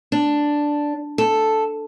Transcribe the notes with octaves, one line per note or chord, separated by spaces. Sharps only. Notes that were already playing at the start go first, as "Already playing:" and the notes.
D4
A4